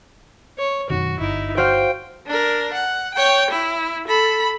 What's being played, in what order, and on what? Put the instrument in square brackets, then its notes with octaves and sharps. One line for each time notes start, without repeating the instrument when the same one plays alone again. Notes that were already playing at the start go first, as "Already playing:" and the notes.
[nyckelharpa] C#5
[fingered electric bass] F#2 B2 D#3 [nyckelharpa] F#4
[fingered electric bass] G1 [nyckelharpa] D#4 E4
[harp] F#4 C5 F5 [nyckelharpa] G5
[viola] D4 A#4
F#5
C#5 G5
E4
A4 B5